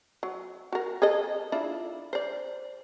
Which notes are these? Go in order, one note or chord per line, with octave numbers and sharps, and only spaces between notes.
F#3
F#4 A#4
G#4 A4 D#5
D4 E4 F4
C5 D5